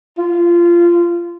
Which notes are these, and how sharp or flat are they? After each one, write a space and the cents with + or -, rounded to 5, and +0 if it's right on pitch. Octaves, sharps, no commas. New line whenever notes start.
F4 -20